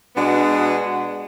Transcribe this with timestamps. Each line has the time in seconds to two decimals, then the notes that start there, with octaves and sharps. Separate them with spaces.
0.15 B2 G#3 B3 D4 F#4